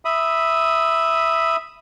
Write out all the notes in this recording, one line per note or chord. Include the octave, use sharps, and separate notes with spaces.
E5 B5 D#6